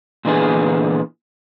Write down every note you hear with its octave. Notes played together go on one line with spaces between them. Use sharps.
A#2 D3 E3 B3 G#4